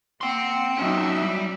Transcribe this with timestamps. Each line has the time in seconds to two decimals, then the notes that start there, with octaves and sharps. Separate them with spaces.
0.21 A#3 F#5 G5 C6
0.78 F#3 C#4 D#4 E5
1.22 G3